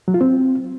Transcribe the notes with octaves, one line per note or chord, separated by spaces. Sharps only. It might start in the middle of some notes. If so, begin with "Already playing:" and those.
F#3
F4
C4